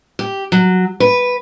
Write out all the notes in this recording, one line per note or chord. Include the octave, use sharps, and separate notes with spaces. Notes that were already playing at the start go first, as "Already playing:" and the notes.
G4
F#3
B4